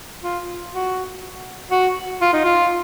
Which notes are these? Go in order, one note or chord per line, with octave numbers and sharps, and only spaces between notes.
F4
F#4
F#4
F4
D#4
F4